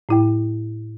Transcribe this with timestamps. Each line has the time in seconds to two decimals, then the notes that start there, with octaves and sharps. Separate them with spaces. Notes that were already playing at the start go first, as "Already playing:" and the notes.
0.09 A2 E4 G5